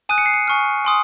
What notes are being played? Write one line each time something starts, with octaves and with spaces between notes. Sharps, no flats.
G#5 D#6 F#6 D#7
C#7
C7
C#7
G#5 C#6 F6
G#5 C6 D#6